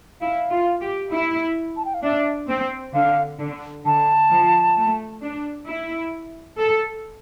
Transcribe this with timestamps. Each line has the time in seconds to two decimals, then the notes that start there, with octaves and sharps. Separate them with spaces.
0.21 E4 F5
0.51 F4
0.82 G4
1.12 E4
1.77 A5
1.85 G5
1.94 F5
2.03 D4 E5
2.48 C4
2.94 D3 F5
3.40 D3
3.85 D3 A5
4.31 F3
4.77 A3
5.23 D4
5.67 E4
6.59 A4